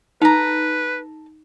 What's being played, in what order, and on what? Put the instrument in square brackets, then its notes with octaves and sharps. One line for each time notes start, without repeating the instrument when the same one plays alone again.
[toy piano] D#4 [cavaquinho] A4 A#5 [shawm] B4